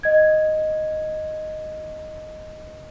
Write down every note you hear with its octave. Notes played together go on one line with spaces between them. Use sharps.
D#5 G#6